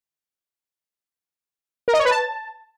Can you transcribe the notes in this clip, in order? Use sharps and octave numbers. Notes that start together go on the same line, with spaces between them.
A#4
D#5
C#5
B4
A5